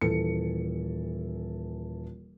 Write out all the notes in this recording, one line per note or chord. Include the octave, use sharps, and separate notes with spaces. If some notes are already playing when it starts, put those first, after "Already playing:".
D#1 E3 A4 C#7